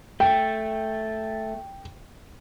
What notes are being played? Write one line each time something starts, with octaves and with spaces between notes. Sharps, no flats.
A3 G5